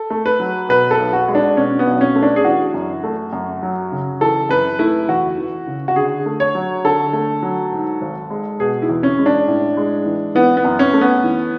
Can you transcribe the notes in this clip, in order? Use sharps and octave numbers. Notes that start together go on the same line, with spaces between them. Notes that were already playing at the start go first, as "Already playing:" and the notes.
Already playing: A4
A3
B4
F#3
B2 B4
A4
B1
F#4
G#3
D4
B2 C#4
B3
B1
C#4
A3
D4
G#4
E3 F#4
F#2
A3
F#2
F#3
C#3
E3 A4
F#2 B4
A3 E4
E2 F#4
E3
C#3
F#4
D3 G#4
A3
C#5
F#3
D3 A4
A3
F#3
G#2
G#1
G#3
B2 G#4
E4
E2
C#4
G#3
D4
A2
G#3
E3
E3 B3
B3
F#2
C#4
A3
B3
E3